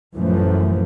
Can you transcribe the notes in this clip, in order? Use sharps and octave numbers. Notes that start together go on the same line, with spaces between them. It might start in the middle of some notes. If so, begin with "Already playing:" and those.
A1 F#2 A#2 E3 F3 A3